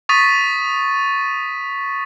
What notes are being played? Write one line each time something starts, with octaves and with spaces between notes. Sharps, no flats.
C#6 D#6 A6 B6 D#7